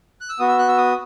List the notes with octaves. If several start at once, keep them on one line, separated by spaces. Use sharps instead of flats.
F#6
E6
B3 F#4 D#6
E6
F#6
E6
D#6